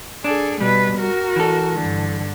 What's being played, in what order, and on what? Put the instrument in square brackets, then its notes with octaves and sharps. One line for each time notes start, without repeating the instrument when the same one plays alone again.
[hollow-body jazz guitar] D4 [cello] G#4 A4
[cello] B2 B4 [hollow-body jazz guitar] G3
[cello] F#4 A#4
[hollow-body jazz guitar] E3 A4
[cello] G2 D3